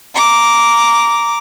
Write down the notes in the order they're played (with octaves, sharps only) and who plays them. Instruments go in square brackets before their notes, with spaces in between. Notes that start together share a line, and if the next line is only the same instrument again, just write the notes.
[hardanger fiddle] A#5 D6